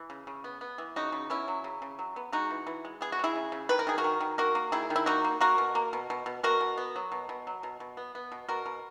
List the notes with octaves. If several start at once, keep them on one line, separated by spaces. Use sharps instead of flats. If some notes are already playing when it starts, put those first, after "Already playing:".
Already playing: E3
C#3
C#3
B3
B3
E3
C#3 D#4 F#4
C#3
B3 C#4 E4
F#3
C#3
C#3
F#3
B3
G#3 D#4 F#4
E3
E3
G#3
B3 G#4
F#4
G#3 E4 G#4
C#3
C#3
D#3 B4
A#4
D#3 G#4
F#4 A#4
D#3
D#3
A#3 F#4 A#4
A#3
D#3 E4 G#4
D#3
E4
A#3 D#4 F#4
A#3
A#3 F#4 A#4
B2
A#3
B2
B2
B2
B2 F#4 A#4
B2
B3
F#3
B2
B2
F#3
B2
B2
B3
B3
B2
B2 F#4 A#4
B2